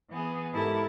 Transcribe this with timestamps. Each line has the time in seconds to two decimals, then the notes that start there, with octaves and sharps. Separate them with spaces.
0.11 E3 B3 G#4
0.55 G#2 E4 G4 A4 A#4 A5